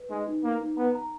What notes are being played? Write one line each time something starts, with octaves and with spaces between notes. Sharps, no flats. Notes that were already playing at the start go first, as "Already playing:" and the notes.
Already playing: B4
G#3 D#4
D#4
A#3 D#4
D#4
B3 A#5
A#5